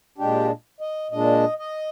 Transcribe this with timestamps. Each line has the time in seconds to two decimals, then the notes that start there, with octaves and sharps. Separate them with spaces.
0.18 A#2 G#3 D4 G4
0.81 D#5
1.12 A#2 G#3 D4 D#5
1.59 D#5